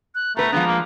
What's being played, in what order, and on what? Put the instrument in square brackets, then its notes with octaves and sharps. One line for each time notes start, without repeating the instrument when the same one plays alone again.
[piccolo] F#6
[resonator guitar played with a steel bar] B2 B4 [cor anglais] A3 [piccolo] A#5
[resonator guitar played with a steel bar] F3 G#3 D4 [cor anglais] B3
[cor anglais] A#3